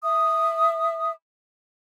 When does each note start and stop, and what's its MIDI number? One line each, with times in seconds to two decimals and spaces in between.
0.04 1.12 76
0.04 1.12 87